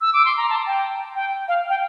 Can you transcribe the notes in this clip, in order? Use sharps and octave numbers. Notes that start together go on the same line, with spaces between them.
E6
D6
C6
A#5
A5
G5
G5
F5
G5